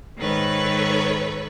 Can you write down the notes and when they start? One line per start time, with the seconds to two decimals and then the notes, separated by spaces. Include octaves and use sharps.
0.18 G#2 D#3 A4 B4 C#5